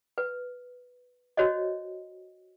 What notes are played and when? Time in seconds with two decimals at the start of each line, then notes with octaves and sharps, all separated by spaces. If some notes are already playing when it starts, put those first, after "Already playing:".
0.18 B4
1.37 F#4 C5 C#5 D#5